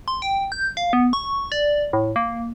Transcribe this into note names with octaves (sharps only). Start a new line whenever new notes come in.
C6
G5
G6
F5
B3
C#6
D5
A2
A#3